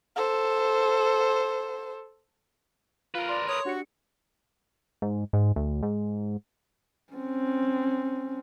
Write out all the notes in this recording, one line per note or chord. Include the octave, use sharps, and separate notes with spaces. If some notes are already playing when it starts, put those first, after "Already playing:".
A4 C5
F4 A#4 B4
D5 C6
C#5 D#6
D4 F#4 G4 C#7
G#2
G#2
D2
G#2
C4 C#4